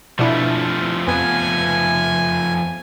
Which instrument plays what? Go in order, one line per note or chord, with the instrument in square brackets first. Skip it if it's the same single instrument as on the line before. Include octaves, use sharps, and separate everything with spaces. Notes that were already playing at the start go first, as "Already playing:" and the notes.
[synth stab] B2 D4 E4 [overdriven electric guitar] F3 A3
[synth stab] F2 B3 [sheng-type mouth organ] G#5